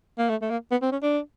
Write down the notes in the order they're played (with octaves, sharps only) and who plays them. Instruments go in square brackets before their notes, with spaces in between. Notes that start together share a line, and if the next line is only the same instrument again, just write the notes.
[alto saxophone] A#3
A3
A3
A#3
B3
C4
C#4
D4